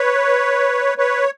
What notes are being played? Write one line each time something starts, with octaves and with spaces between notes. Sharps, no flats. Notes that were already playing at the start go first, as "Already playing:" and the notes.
Already playing: B4 C#5
B4 C#5